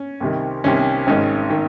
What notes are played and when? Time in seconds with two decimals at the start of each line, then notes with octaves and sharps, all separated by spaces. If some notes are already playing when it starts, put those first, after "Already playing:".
Already playing: C#4
0.20 C2 C3 D#3
0.64 C2 C3 D#3 C#4
1.07 G#1 G#2 D#3 C#4
1.50 D#3